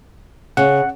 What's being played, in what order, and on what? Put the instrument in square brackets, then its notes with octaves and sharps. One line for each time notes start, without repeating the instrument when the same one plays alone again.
[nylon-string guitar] C#3 [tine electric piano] F#5